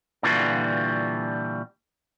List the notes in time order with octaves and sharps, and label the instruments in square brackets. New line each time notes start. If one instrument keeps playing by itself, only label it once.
[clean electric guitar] A#2 D3 E3 G3 F4 F#4